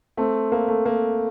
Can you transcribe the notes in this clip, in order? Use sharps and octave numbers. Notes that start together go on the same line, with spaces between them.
A3 C4
A#3
A3
A#3